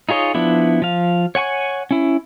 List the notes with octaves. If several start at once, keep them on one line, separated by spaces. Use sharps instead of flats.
D#4 F4 G#4 C#5 D#5
F3 B3 D4 E4
F3 F5
C#5 F#5 G#5 C#6
C#4 E4